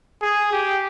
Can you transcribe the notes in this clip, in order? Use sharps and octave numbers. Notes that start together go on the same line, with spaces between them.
G#4
G4